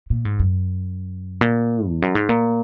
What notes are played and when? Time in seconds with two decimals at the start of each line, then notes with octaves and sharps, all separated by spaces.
0.10 A#2
0.25 G#2
0.39 F#2
1.41 A#2
1.88 E2
2.02 F#2
2.15 G#2
2.29 A#2